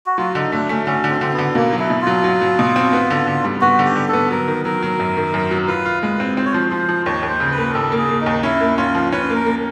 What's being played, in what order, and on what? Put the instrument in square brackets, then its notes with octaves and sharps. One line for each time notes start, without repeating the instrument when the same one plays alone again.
[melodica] F#4
[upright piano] F#3 [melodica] F4
[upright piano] D3 [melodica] D#4
[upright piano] A3 [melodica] D4
[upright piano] A3 [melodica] C#4
[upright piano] D3 [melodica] C#4
[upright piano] D3
[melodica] C4
[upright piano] D3 [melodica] C4
[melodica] B3
[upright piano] D3
[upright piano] B2 [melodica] A#3
[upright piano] F#3
[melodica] E4
[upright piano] B2
[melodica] F4
[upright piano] F#3
F#3
F#3
B2
C4
B3
D3
D3
G3
[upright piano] B3 [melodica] F#4
[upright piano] D3
[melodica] G4
[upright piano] D3
[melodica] A4
[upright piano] B3
[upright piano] F#3 [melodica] A#4
[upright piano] D#3
[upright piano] F#3 [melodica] A#4
[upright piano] F#3
F#2
D#3
F#2
F#3
[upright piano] F4 [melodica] B4
[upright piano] F4
[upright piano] G#3 [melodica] B4
[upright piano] C4
[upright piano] C4 [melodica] C5
[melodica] C#5
[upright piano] F3 [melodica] C5
[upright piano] F3 [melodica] C5
[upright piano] F3
[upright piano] D#2 [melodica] C#5
[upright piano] D#2
[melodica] C5
[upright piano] C#3
[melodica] B4
[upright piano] A#3
[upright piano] D#2 [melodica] A4
[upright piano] A#3
[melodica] G#4
[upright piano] A#3
[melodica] D#4
[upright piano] D#2
[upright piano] C#4 [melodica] E4
[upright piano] A#3
[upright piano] C#4 [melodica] F4
[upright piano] F3
[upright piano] C#4 [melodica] B4
[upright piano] A#3
[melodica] A#4
[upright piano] A#3